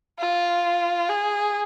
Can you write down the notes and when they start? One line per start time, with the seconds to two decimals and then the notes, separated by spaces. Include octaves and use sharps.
0.19 F4
1.09 G#4